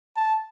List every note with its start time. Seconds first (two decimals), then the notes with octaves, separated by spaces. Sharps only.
0.16 A5